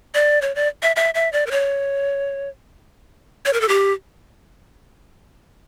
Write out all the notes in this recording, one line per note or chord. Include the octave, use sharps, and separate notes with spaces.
D5
C#5
D5
E5
E5
E5
D5
A#4
C#5
C#5
A#4
A4
G4